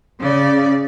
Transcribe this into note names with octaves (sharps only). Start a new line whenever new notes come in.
C#3 D5